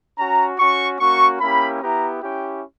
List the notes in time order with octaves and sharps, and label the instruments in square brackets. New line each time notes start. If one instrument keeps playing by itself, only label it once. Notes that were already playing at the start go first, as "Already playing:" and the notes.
[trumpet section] C#4 F#4 A#5
C#4 F#4 C#6
A#3 C#4 F#4 C#6
A#3 C#4 E4 G4 B5
B3 E4 G4 A#5
C#4 E4 G4 G5